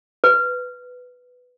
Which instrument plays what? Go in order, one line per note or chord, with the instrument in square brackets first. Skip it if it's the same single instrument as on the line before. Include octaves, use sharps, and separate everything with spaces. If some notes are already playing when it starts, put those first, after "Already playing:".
[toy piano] B4